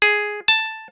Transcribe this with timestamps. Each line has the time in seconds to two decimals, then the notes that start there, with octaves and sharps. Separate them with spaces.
0.02 G#4
0.48 A5